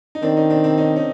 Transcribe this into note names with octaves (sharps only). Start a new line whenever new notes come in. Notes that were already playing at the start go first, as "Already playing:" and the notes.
D#4
D#3 C4 D4
C#4 D#4
C4 D4
C4 D4
C#4 D#4
C#4 D#4